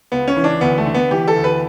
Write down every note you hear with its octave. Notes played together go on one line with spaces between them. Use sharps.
C#2 B3
C#4
E3
D4
D2 B3
A3
D3
B3
E3 G4
A4
D2
B4